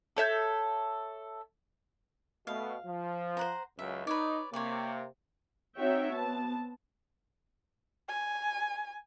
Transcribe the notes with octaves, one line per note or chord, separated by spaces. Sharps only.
A4 C#5 E5 G6
B2 A3 F5
F3
C5 F#5 A#5
C#2 F#2 E5
D#4 B4 C#5 D5
C3 A#3 C#5 D5
C4 D#4 F#4 C#5 E5 G5
B3 C4 A5
G#5